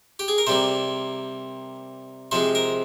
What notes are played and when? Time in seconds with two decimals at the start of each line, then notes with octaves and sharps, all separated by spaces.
0.19 G4
0.28 G#4
0.38 A#4
0.47 C3 G3 A#3 C5
2.31 C3 F3 G#3 C5
2.55 A#4